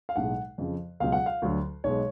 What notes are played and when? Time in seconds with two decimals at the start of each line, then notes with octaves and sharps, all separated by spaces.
0.09 F5
0.16 B1 A2 G#3 F#5
0.58 F2 C#3 F3
1.00 C#2 B2 F#3 F5
1.12 F#5
1.26 F5
1.42 D2 D3 F#3
1.84 B1 B2 G#3 C#5